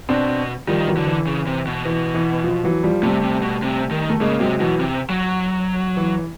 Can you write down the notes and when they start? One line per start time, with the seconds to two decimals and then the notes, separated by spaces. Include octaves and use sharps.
0.09 B2 C4 D4
0.67 D#3 F3 G3
0.87 E3 F#3
0.97 D3
1.07 E3
1.27 C#3
1.47 C3
1.67 B2
1.85 E3
2.14 E3
2.44 F3
2.64 E3 F#3
2.83 F3 G3
3.03 C3 G3 A3
3.23 C3
3.42 B2
3.63 C3
3.91 D#3
4.10 A3
4.20 C#3 G#3 A#3
4.40 C3 F#3 G#3
4.60 B2 E3 F#3
4.80 C3
5.10 F#3
5.97 E3